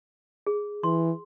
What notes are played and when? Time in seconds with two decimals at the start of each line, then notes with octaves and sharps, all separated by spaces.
0.46 G#4
0.83 E3 C6